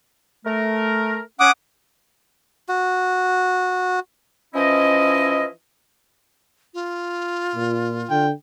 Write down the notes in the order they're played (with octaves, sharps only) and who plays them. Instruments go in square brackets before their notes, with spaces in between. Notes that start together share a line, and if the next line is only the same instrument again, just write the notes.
[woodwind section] A3 A#4
[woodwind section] C#4 [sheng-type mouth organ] F#5 D6 D#6
[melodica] F#4
[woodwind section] E3 F3 C#4 E4 D#5
[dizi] F4
[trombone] A#2
[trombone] D3 [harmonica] G5